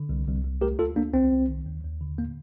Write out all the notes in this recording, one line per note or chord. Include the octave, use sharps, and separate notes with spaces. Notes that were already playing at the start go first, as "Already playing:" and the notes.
Already playing: D3
C2
C2
C2
A3 G4 A#4
D2 F4 A4
D2 A#3 D4
C2 C4
C2
D#3
D#2
D#2
D3
A2 A#3